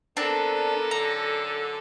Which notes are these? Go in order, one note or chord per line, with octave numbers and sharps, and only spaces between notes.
D3 B3 C4 D4 A4 A#4
F#2 D3 A#5